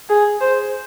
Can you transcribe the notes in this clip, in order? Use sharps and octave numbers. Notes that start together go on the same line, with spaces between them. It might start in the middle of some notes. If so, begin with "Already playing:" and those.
G#4
C5